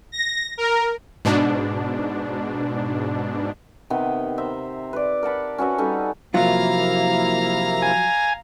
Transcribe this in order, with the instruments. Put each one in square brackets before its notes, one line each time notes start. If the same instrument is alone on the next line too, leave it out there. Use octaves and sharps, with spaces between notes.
[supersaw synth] A#6
A#4
G#2 B2 D4
[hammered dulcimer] C3 D#3 B3 G5
C5 E5 A#5
B4 D5
A#4 F#5 A5 B5
C#4 F#4 B4 E5
G3 C#4 D#4 A4
[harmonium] C3 A#3 E4 [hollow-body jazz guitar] F3 F#3 F4 [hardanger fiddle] F5 A#5
[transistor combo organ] G#5